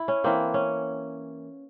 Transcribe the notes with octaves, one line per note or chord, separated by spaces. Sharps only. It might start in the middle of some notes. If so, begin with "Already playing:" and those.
Already playing: E4
C#4
E3 A#3 C4
C#4